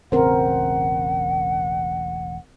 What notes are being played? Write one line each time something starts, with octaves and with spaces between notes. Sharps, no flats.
E1 A1 C#3 C4 A#4 C5 F#5